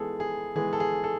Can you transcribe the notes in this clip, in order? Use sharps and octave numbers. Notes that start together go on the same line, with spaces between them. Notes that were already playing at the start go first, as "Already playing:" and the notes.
Already playing: E3 G#3 B3 G#4 A4
G#4
E3 G#3 B3 G#4
A4
G#4
A4